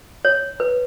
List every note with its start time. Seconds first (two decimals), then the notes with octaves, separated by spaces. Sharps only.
0.25 C#5
0.60 B4